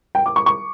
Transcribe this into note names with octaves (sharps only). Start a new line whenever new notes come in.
G5
D6
C#6
C#6